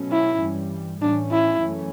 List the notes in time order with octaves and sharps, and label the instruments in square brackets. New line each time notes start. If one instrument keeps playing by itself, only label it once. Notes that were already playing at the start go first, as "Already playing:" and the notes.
Already playing: [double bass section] B2 F#3 A3 C#4
[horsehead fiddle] E4
[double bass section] G2 E3 G3
[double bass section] A2 E3 G3 C#4 [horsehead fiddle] D4
[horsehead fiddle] E4
[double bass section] F#2 E3 A3 C#4